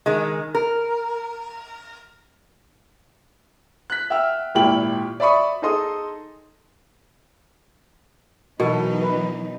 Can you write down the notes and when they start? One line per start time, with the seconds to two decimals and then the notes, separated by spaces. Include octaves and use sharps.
0.06 D#3 G#3
0.55 A#4
3.90 F#6 B6
4.10 E5 F#5 G5 E6 F6
4.55 G#1 A#2 E4 G4 G5 F#7
5.20 D5 E5 B5 C#6 D#6
5.62 D#4 G#4 A4 D#5 C6 D#6
8.60 B2 E3 F#3 D#4 F#4 A4 A#4
9.02 B4